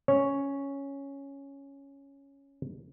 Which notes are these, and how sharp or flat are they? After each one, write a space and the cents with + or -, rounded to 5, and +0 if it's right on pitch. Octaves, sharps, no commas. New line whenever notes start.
C#4 +0 C#5 +0